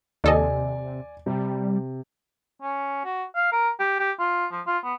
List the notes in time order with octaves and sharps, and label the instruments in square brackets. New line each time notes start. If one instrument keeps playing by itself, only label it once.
[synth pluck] D#2 A4 D#5 [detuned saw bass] C3 [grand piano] D5 G#5
[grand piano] C3 [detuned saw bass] G3
[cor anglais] C#4
F#4
F5
A#4
G4
G4
F4
F3
F4
B3